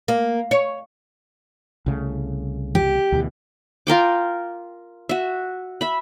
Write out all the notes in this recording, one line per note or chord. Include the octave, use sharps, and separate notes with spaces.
A#3
C#5
C2 C#3 A3
G4
D2 B2 E3
F4 A#4 G5 D6
F#4 E5
E5 B5